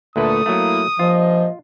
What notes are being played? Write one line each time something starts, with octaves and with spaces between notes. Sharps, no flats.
D2 A#2 A3 B4 D#6
F#3 A3 A#3 E4
G2 A#2 F3 F4 D#5